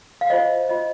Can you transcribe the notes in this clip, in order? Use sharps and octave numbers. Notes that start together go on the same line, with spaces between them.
F5
F4 C5 D#5
F4 C5 D#5